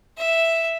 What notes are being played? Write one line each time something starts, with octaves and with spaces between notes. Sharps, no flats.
E5